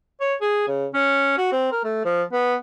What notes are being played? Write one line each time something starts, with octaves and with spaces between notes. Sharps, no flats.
C#5
G#4
C#3
C#4
F#4
C4
A#4
A3
F3
B3